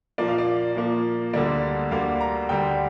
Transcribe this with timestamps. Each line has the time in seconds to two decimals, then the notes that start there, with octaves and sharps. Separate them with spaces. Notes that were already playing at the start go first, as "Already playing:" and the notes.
0.18 A#2 F3 A#3 D5
0.28 F5
0.38 D5
0.76 A#2 F3 A#3
1.33 D2 D3 G3 A#3 D5
1.91 D2 D3 G3 A#3 F5
2.21 A#5
2.49 D2 D3 G3 G5